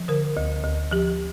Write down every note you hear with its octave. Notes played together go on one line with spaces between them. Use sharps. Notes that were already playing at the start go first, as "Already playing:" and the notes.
Already playing: F3
D3 A#4
D2
D2
F3 G4